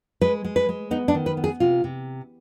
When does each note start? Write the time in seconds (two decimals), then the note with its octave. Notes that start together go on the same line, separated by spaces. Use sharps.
0.21 G#3 B4
0.45 G#3
0.56 B4
0.69 G#3
0.91 B3 D#4
1.08 D4
1.15 D#3
1.26 B4
1.37 B3
1.44 G#4
1.60 C3 F4
1.84 C3